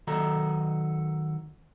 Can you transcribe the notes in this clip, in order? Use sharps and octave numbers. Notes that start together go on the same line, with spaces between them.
D#3 F#3 A4 A#5